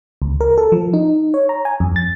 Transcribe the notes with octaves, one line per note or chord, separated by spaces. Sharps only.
C#2
A#4
A4
F3
D#4
C#5
A#5
G#5
F2
A6